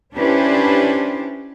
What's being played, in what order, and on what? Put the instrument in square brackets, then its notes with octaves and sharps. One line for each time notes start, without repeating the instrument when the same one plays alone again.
[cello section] C#4 D4 E4 G4 B4 C5